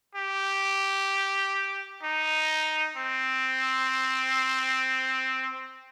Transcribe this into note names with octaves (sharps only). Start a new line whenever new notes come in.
G4
D#4
C4